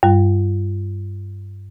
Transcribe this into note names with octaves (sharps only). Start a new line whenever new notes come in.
G2 G3